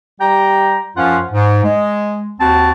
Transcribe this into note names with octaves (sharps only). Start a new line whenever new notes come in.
G3 G4 G5 A#5
F#2 F3 C#4 F4 F5 F#5
G#2
G#3
D#2 C4 F#4 A5